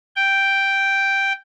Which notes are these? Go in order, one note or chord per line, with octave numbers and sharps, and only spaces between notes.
G5